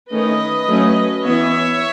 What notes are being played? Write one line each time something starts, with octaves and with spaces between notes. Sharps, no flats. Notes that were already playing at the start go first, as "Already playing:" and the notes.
D#3 A3 C#4 B4 D#5
F#3 A3 C#4
E3 B3 C#5 E5